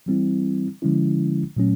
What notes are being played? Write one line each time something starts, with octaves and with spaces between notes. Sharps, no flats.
E3 G3 C4 E4
D3 F3 G#3 C#4 E4
A#2 F#3 A3 C#4